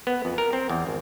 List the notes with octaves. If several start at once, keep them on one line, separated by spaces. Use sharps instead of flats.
B3
F2
A#4
C4
E2
G#1